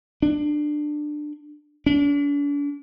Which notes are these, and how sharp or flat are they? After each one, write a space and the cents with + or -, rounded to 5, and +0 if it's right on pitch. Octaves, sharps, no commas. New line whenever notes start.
D4 +20
D4 -40